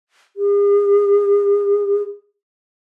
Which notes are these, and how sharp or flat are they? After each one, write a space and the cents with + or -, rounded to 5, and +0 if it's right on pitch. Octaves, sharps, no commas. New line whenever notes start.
G#4 -45